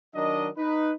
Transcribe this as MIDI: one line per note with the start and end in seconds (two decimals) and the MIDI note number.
0.15 0.48 51
0.15 0.48 54
0.15 0.48 62
0.15 0.48 70
0.15 0.48 75
0.57 0.92 63
0.57 0.92 71